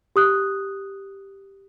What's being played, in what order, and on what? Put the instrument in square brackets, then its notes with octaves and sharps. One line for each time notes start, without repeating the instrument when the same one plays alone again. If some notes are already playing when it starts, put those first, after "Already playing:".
[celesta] G4 D#6 F#6